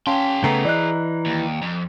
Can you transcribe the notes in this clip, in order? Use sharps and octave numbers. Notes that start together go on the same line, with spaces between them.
C#4 G#4 F5 G5 A5 C6
C#3 A3 B3 A#5 C7
E3 D5 D#5 F#6
D#2
F2